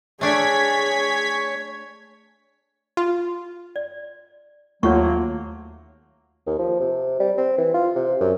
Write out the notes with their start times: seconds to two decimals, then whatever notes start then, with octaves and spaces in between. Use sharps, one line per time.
0.21 A3 D4 G#4 C#5 G#6 B6
2.97 F4
3.76 D5
4.83 D#2 F#3 A3 A#3 F4 C#5 F#5 C#6
6.47 D#2
6.59 F3
6.80 C3
7.20 G3
7.37 C4
7.58 E3
7.74 F4
7.96 C3
8.21 F#2